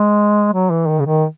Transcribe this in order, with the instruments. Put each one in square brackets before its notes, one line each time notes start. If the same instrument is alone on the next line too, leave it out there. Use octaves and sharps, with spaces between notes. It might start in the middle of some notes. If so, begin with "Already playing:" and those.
Already playing: [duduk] G#3
F#3
E3
D#3
C#3
D#3